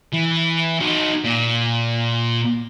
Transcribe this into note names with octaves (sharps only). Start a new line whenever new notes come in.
E3
D#4 F#4
A#2